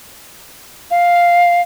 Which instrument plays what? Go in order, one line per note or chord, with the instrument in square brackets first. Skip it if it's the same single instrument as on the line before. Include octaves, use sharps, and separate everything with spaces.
[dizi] F5